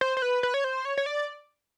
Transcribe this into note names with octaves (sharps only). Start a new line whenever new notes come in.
C5
C5
B4
B4
C#5
C5
C#5
C#5
D5